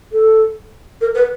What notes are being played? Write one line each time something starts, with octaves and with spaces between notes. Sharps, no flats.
A4
A#4
B4